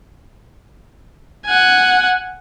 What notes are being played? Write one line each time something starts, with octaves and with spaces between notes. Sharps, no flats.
F#5 G#5